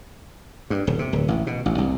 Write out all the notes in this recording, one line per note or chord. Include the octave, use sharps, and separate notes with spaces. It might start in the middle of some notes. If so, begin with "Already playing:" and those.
G2
D#1
C3
D1
A1
B2
A1
C2